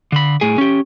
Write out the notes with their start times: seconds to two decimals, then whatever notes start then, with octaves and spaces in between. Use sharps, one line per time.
0.12 D3 B5
0.41 A2 G#4
0.58 C#4 G4